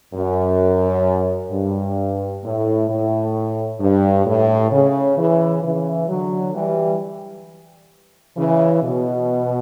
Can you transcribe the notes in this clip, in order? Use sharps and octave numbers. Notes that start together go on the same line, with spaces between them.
F#2
G2
A2
A2
G2
A2
C#3
C#3 E3
C#3 E3
D3 F#3
E3 G3
C#3 E3
B2